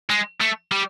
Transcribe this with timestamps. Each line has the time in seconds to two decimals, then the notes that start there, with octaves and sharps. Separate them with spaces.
0.10 G#3
0.41 A3
0.72 G3